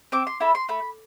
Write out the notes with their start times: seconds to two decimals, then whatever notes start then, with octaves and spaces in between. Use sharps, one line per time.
0.12 C4 D6
0.27 C6
0.40 E4 A4 B5
0.55 C6
0.69 A3 B5